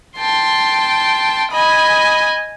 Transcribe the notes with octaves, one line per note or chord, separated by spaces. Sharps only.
G5 A5 C6
D#5 G#5 B5